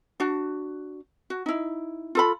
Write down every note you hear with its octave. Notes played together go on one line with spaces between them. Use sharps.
D4 F#4
F#4
D#4 E4
F4 A4 B5